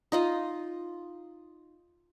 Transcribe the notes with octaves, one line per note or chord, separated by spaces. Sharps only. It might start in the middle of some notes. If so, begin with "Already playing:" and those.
D#4 F4 D#5